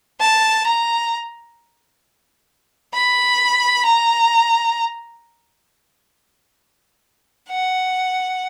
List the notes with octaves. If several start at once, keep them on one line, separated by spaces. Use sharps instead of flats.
A5
A#5
B5
A#5
F#5